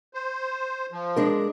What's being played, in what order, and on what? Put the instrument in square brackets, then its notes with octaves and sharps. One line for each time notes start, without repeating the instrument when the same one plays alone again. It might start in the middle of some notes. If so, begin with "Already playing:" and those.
[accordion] C5
F3
[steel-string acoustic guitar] G#3 D4 A#4